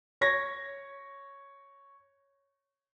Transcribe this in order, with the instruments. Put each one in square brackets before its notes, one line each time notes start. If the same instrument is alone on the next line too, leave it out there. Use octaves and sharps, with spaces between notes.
[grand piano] C#5 G#6 A#6